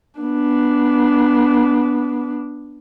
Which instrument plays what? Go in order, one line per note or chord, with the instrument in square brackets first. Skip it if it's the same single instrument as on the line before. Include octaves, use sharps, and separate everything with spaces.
[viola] B3 D4